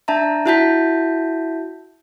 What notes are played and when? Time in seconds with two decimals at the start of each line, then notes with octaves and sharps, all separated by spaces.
0.08 D4 E5 A5 A#5
0.46 E4 F#4 E5 A5 G6 B6